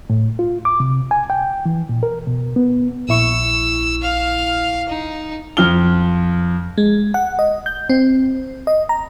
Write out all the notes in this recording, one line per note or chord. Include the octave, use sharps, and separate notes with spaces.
A2
F4
D6
C3
G#5
G5
E3
A#2
A#4
B2
B3
A#1 E4 C#6 E6
F5 F6
D#4
F2 F3 F6 G7
G#3
F#5
D#5
G6
C4
D#5
A#5